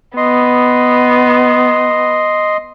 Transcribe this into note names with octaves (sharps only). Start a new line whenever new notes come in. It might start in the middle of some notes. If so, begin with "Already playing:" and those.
B3 D#5 C6